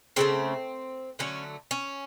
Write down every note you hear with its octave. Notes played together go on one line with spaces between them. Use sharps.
C#3 F#3 A3 C4
D3 F#3 A3 C#4
C#4